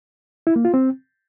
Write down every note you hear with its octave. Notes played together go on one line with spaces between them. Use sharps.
E4
A#3
F4
C4